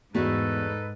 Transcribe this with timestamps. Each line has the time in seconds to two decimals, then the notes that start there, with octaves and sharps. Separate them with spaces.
0.14 E2 G#2 A3 D#4 F#4 G#4 A4 B4